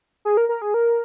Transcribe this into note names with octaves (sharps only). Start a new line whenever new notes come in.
G#4
A#4
A#4
G#4
A#4